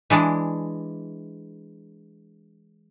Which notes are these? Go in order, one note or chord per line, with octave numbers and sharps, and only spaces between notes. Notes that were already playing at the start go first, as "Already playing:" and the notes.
E3 G#3 D4